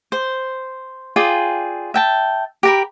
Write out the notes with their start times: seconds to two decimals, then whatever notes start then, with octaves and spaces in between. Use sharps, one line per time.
0.12 C5
1.16 F4 G#4 D5 G5
1.94 E5 G5 A5
2.63 G4 A#4 B5